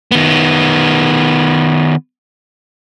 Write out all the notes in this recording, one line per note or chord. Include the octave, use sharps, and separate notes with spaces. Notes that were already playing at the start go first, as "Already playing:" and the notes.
D#3 B3